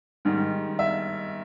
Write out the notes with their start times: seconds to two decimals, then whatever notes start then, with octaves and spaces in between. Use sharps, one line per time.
0.25 G#2 D#3 G3
0.79 E5